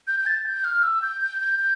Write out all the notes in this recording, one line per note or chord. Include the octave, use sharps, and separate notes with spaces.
G6
G6
A6
G6
F6
E6
G6
G6
G6
G6